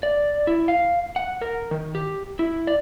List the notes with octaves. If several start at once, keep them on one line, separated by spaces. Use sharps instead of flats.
D5
E4
F5
F#5
A#4
D#3
G4
E4
D5